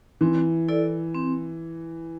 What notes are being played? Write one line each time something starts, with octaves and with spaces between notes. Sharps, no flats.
E3 C4
E4 A4 D5
C4